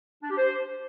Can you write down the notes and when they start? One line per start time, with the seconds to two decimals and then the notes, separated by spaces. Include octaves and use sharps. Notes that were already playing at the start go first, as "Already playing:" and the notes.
0.23 D4
0.30 G4
0.38 C5